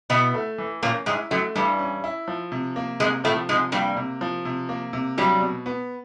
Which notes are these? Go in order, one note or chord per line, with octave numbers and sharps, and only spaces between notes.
B2 B3 E4
A3
E3
A#2 A#3 C#4
G#2 G#3 E4
F#2 F#3 A3
G2 E3 G3
C#4
E4
F3
C3
A#3
G#2 C3 G#3
A2 F3 A3
G#2 C3 G#3
G2 G3 A#3
C3
F3
C3
A#3
C3
G2 F#3 G3
B2
B3